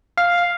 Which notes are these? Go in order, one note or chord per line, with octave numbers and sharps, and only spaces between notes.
F5